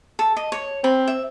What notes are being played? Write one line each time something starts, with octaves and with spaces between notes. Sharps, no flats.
A4
D#5
C#5
C4 B5
E5